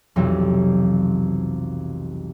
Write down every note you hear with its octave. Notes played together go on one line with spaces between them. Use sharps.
B1 F2 C3 E3 F#3 G3